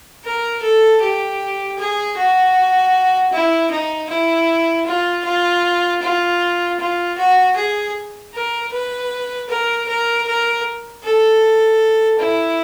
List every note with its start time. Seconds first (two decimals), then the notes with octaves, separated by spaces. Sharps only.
0.24 A#4
0.62 A4
1.01 G4
1.78 G#4
2.17 F#4
3.32 E4
3.70 D#4
4.10 E4
4.86 F4
5.24 F4
6.02 F4
6.79 F4
7.18 F#4
7.56 G#4
8.34 A#4
8.72 B4
9.49 A#4
9.88 A#4
10.27 A#4
11.04 A4
12.19 E4